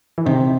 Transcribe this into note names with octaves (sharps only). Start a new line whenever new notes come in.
E3
C3 D#3